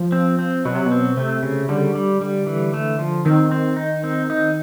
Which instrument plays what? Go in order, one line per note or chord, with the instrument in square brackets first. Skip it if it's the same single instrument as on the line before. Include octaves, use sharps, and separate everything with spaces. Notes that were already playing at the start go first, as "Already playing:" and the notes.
Already playing: [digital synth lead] F3
[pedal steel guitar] C4
C4
[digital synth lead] B2 [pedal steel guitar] F#3
[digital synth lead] C3
B2
[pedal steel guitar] C4
[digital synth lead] C3 [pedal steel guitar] A3
[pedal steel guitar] C#3
[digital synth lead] D3 [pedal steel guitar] G3
[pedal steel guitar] G3
G3
E3
A3
F3
[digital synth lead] D#3 [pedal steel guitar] C4
[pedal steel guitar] C4
D#4
C4
D#4